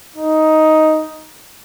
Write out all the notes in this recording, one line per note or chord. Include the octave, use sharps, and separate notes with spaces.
D#4